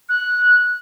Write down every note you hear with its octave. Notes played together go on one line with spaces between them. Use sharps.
F#6